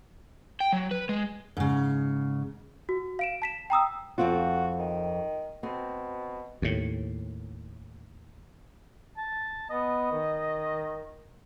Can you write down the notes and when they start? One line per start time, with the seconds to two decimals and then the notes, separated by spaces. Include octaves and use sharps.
0.60 G5
0.73 F#3
0.91 B4
1.09 G#3
1.57 G#2 C#3
2.89 F#4
3.19 F5 D7 E7
3.42 A5 B6 E7
3.70 G5 A#5 D#6 E6
4.18 F2 C4 F4 F#4
4.79 D#3
5.63 B2 C4
6.62 D#2 A2
9.17 A5
9.70 B3 D#5
10.11 D#3